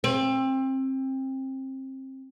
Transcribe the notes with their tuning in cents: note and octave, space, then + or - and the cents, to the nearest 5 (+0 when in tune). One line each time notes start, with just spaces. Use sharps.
C4 +25